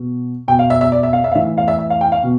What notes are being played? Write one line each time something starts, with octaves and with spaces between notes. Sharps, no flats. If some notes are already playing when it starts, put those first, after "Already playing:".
Already playing: B2
B2 G5
F5
E5
E5
D5
E5
F5
E5
F5
A2 E3 E5
F5
E5
E5
F5
G5
F5
B2